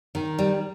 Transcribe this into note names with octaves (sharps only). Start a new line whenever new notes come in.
D#3
G3